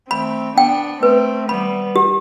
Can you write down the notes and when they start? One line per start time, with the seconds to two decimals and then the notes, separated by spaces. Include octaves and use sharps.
0.11 A3 C4 B5
0.56 B3 D4 G5
1.02 A3 C4 B4
1.49 G3 B3 B5
1.96 G4